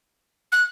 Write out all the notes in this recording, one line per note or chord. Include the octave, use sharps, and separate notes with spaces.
F#6